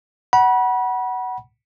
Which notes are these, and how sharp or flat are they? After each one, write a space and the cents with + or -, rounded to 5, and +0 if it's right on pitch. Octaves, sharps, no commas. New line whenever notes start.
F#5 +15 B5 -30